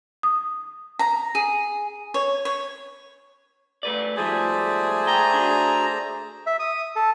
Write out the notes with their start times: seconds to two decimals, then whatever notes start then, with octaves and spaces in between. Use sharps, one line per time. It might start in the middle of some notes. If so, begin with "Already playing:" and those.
0.23 D#6
0.99 A#5
1.35 G#4
2.14 C#5
2.45 C#5
3.83 A3 B4 D5
4.17 G#2 F3 G3 A3 G#4 C5 D5
5.07 G5 A#5
5.34 D4 F#4
6.47 E5
6.59 D#6
6.96 A4